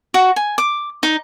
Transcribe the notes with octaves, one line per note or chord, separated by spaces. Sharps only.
F#4
G#5
D6
D#4